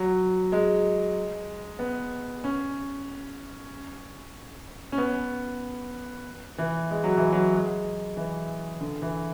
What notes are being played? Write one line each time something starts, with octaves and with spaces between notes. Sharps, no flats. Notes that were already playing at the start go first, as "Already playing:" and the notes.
Already playing: F#3
G#3
B3
C#4
C#4
B3
E3
G#3
F#3
E3
F#3
G#3
E3
D3
E3